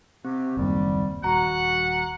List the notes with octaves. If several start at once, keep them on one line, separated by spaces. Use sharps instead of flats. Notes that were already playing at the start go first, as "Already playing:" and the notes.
C3 C4 G4
F#1 D#2 G3
D#1 F#4 F#5 A#5